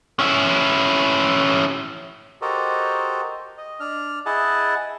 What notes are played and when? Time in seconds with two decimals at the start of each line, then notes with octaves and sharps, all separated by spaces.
0.19 C#4 E4
2.42 F#4 G4 A4 A#4 C5 D#5
3.58 D#5
3.80 D4 F6
4.26 E4 G#4 D#5 F#5 A5